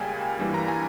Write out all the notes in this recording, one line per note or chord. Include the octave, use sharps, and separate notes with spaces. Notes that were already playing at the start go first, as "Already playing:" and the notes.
Already playing: C#2 C#3 G3 A#3 G5 G#5
G2 E3 G3 A#3
A#5
G#5